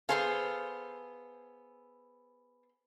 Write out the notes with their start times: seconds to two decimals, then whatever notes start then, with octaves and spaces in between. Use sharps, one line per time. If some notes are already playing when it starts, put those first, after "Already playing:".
0.09 B3 G#4 A4 C5 F5